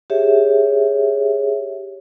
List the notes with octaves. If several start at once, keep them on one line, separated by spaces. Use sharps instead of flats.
G4 G#4 C#5 E5